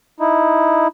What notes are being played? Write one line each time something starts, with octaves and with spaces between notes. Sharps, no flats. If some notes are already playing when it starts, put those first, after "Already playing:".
D#4 E4